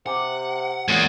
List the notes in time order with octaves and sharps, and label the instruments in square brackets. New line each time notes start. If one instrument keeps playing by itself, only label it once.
[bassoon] C3 [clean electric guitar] G4 [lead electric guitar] F#5
[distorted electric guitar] E2 [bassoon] A#2 [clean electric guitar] G#3 A#3 C#4